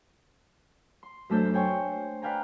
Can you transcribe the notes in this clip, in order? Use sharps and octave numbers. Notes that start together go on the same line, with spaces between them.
C6
F#2 A3 D4 A4 C5 G6
C5 C#5 G5 G#5 C6 C#6
C5
B4 D5 F5 G5 G#5 A#5